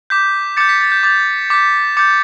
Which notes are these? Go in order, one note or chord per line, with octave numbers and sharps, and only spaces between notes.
D6 G6 B6
D6 G6 A6 C#7
B6
A6
G6
D6 G6 A6
D6 G6 B6
D6 G6 A6 C#7